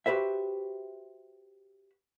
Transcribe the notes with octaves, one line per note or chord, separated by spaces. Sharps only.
F#4 G4 B4 C5 E5